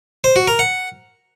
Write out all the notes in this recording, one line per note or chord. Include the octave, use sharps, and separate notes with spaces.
C5
F#4
A#4
F#5